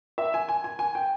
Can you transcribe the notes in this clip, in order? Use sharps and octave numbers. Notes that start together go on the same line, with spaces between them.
E5
G#5
G#5
G#5
G#5
G5